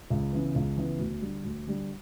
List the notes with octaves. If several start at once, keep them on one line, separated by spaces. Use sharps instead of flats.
C#2
C#3 E3 B3
C#2
C#3 E3 B3
D2
D3 G3
D2
D3 G3